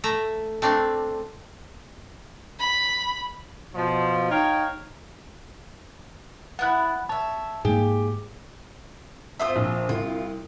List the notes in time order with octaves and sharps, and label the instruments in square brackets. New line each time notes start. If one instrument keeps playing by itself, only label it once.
[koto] A3 E5 A#5
A3 C4 D4
[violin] B5
[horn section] B2 F3
D#4 C#5 F5 G5
[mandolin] B3 E4 B5 [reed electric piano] F#5 F#6
[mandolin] C#5 E5 [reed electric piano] A5
[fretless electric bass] G#2 G#3 A#3 [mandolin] G4 [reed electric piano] G#4
[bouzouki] C4 F4 C5 [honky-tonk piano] E5 D#6
[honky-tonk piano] A#1
[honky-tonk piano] C2 [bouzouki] F4